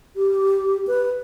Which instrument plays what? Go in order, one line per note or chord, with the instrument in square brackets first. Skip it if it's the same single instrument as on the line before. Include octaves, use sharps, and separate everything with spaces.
[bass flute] G4
B4